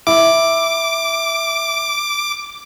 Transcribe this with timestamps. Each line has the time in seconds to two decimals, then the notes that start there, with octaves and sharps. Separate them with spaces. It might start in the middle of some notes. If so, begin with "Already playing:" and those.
0.07 E4 D6